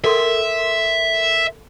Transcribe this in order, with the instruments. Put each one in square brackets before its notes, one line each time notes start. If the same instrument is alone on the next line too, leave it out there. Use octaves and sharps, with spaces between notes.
[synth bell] A4 A#4 C6 [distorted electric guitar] E5